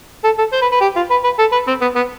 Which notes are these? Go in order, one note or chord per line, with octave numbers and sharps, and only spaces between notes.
A4
A4
C5
B4
B4
G4
F4
B4
B4
A4
B4
C4
B3
B3